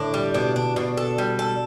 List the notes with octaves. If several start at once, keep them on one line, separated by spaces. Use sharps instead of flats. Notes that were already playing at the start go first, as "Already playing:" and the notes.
Already playing: A2 D3 D4
G3
B2 D4
D4
B2 D4
A4
G3
A4